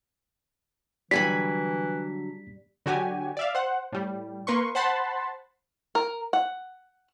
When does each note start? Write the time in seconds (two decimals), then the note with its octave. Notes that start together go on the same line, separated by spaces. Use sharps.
1.11 D3 E3 F#3 G3 G#5 B5 B6
2.86 D3 F#3 F#4 G4 G#5
3.37 D5 E5 F5
3.55 C5 F#5
3.92 A2 G3
4.47 A#3 A#4 B4 C6 C#6
4.75 C5 F#5 A5 B5 C6
5.95 A#4
6.33 F#5